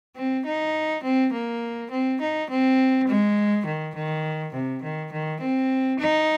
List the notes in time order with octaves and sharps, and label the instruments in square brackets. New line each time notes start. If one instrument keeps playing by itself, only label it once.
[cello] C4
D#4
C4
A#3
C4
D#4
C4
G#3
D#3
D#3
C3
D#3
D#3
C4
D#4